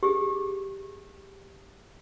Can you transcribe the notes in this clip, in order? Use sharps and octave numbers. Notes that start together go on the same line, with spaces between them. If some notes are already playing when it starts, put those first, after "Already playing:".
G4 G#4